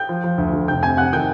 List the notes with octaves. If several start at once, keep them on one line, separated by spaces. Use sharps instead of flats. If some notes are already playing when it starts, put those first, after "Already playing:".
Already playing: G5 G6
F3
F3
D2
D3
F1 G5 G6
C3 G#5 G#6
C3 F#5 F#6
D#3 G5 G6